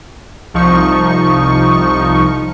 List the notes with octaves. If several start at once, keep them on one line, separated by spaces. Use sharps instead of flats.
C2 F3 D#4 C#6